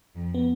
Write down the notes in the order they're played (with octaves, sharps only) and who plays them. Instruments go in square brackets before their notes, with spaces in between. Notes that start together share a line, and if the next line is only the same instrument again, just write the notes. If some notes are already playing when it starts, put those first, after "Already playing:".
[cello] F2
[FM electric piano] B3